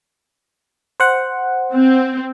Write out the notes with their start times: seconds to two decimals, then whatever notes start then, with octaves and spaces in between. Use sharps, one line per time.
1.00 C5 F#5
1.74 C4